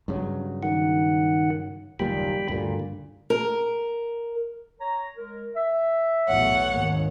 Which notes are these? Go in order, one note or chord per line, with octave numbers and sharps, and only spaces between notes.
G2 C#3 F#3
D#3 F#5
F#1 D#2 A#2 G3 G5 B5
D2 G2 A#2 D3
A#4
C#5 A#5
G#3 A#4
E5
B1 E2 A2 C#5 F#5
G#1 D#2